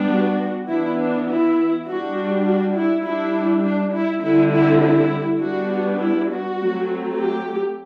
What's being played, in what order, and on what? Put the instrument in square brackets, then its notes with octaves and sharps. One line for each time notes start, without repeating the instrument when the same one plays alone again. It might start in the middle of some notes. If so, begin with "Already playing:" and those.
Already playing: [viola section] G3 B3 D4
F#4
E3 B3 D4 E4
D4
E4
G3 D4 F#4
F#4
E4
G3 D4 E4
D4
E4
D3 G3 C4 E4
E4
E4
G3 B3 D4 F#4
E4
F#4
F#3 A3 C4
G4